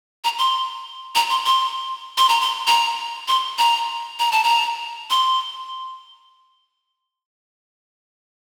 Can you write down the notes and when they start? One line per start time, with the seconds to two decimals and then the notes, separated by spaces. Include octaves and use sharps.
0.24 A#5
0.39 C6
1.15 A#5
1.30 C6
1.46 C6
2.18 C6
2.29 A#5
2.41 C6
2.67 A#5
3.28 C6
3.58 A#5
4.19 A#5
4.32 A5
4.44 A#5
5.10 C6